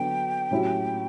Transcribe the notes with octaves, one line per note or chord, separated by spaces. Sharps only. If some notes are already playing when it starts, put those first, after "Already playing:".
Already playing: D3 F#3 B3 D4 A4 G5
A2 F#3 C#4 E4 G4